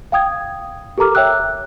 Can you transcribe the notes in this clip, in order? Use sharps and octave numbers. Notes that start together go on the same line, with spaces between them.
F5 G5 D#6 G#6
G4 A4 A#4 A#5 D6 F6
C#5 E5 G5 E6 F#6